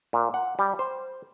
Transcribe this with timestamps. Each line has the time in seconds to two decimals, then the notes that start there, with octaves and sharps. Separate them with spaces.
0.13 A#2
0.34 F#5
0.59 G3
0.79 C5